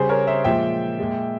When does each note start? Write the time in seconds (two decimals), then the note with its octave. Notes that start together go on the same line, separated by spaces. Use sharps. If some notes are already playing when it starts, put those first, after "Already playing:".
Already playing: C#3 G3 G#4 C5
0.09 A#4 C#5
0.27 C5 E5
0.44 A#2 F3 G#3 E5 G5
0.99 A#2 G#3